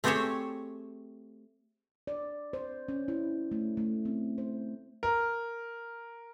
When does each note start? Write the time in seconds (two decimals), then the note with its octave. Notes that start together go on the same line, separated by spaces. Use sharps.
0.04 A3 C4 G4 G#4 C5 C#5
2.07 D5
2.53 C5
2.88 C#4
3.08 E4
3.51 A3
3.77 A3
4.05 C4
4.38 C5
5.03 A#4